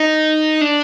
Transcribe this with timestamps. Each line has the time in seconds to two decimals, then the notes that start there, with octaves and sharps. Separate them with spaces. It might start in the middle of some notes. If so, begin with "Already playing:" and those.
Already playing: D#4
0.61 D4